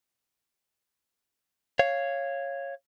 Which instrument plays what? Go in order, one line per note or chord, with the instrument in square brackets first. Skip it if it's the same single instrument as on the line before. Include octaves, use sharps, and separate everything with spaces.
[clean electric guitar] C#5 F5